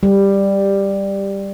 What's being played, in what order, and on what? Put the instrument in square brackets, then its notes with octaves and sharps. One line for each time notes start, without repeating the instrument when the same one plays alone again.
[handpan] G3